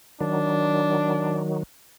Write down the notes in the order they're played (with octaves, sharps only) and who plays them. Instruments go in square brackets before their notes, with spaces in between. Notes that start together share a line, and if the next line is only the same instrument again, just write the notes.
[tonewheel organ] D#3 F#3 [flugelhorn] D4